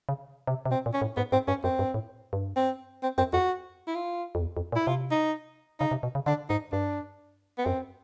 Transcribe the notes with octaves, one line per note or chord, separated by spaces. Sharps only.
C#3
C3
C3
B2 C4
A#2
C#4
A2
G#2 B3
G#2 C4
G2 C#4
F#2 C4
G2
A2
G2
C4
C4
F#2 C4
F2 F#4
E4
F4
F2
E2
F2
A#2
E4
C3 F4
D#4
C#3 D#4
C3
B2
C#3
D3 D4
G#2 D#4
G2 D4
B3
F#2 C4